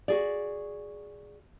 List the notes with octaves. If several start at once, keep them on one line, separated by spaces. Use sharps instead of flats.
F#4 G#4 D5